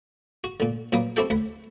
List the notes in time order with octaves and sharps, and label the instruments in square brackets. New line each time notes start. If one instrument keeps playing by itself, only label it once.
[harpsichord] F#4
A#2 D3
A#2 F#3 A#3 B4 D#6
C4 E4 F#4 G4 A4 G5
D2 F#5 B5